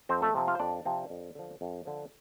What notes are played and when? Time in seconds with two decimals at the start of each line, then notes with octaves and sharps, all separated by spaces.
0.09 F2 C4 C5
0.22 A3 A4
0.35 C3 F3 C4
0.48 F4 F5
0.55 C5
0.59 F2 D4 D5
0.85 C3 F3 C4
1.10 F2
1.35 D3 F3
1.61 F2
1.85 D3 F3